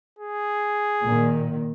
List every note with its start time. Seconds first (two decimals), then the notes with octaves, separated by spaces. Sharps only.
0.19 G#4
1.04 A#2 D#3